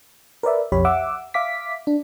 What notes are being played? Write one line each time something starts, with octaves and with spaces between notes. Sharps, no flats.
A#4 B4 D5 E5
B1 F2 G4 C#5 B5
E5 F#5 D6 E6
E5 F5 D6 B6
D4